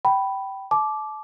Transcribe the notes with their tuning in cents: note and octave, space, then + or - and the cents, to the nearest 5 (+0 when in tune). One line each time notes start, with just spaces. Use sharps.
G5 -20 B5 +0
A5 -30 D6 +0